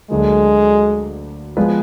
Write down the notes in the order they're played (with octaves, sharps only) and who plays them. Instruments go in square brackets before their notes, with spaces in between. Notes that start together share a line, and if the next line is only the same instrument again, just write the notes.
[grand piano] D2 D3 F#3 A#3 [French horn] G#3
[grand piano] F3 G#3 B3 F4 B4